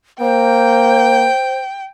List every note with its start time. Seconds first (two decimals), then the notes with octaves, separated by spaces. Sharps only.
0.21 A#3 C5 G5